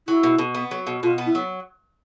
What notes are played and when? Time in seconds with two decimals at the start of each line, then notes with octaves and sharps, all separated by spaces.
0.08 F#3 E4
0.23 B2
0.38 B2
0.55 B3
0.71 F#3
0.87 B2
1.03 B2 F4
1.18 B3
1.26 E4
1.35 F#3